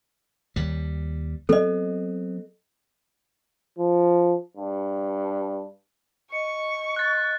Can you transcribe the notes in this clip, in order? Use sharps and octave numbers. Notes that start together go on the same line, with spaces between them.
D#2 G3
F#3 B3 C4 A4 D#5
F3
G2
D#5 C#6 C#7
F#6 A6